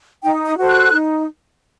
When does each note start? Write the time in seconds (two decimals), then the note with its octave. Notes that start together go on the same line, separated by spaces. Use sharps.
0.23 D#4 G5
0.45 D#6
0.57 F#4 A4 C5
0.68 F#6
0.91 D#4